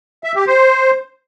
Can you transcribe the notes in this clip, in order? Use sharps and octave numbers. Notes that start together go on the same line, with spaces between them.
E5
G4
C5